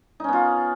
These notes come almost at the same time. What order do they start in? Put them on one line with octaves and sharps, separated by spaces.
D#4 C#4 B3 F4